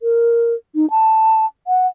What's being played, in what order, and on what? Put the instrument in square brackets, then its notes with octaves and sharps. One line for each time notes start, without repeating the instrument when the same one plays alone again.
[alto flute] A#4
D#4
A5
F#5